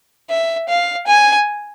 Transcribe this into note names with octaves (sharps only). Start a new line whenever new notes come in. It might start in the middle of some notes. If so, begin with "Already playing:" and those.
E5
F5
G#5